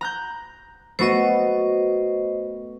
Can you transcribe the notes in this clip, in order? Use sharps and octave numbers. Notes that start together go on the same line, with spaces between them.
A#5 F#6 G6
A3 B3 F#4 C5 D#5